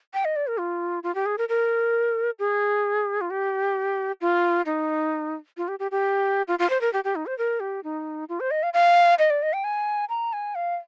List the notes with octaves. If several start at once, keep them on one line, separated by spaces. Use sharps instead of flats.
G5
D#5
D5
A#4
F4
F4
G4
G#4
A#4
A#4
G#4
F4
G4
F4
D#4
F4
G4
G4
G4
F4
F4
C5
A#4
G4
G4
D#4
C5
A#4
G4
D#4
F4
C5
D#5
F5
F5
D#5
D5
D#5
G5
G#5
A#5
G#5
F5